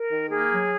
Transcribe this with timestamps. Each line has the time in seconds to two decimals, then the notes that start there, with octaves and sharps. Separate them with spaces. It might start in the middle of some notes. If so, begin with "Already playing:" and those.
Already playing: A#4
0.12 D#3
0.31 A#3 G#4
0.51 F#3